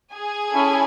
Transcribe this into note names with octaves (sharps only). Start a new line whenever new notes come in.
G#4 G#5
C#4 E4 A4